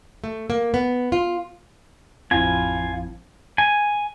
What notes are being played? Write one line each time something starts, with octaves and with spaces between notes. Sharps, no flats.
A3
A#3
B3
F4
A1 F2 F3 C4 E4 F4 G#5
G#5